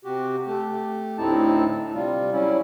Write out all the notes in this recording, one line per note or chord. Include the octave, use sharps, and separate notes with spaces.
C3 F#4 G4
A3 G4
D2 A2 C4 D#4 E4 A5
C3 G3 F4
F#3 G3 C#4 E4